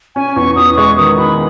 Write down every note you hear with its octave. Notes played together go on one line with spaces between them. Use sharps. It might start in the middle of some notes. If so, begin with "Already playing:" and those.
C#4 G#5
E2 C#6
E2 D#6
G#3 C#6
D#3 D#6
D#3 B5